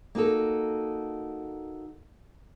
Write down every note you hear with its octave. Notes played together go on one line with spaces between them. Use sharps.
A#3 D#4 F#4 A4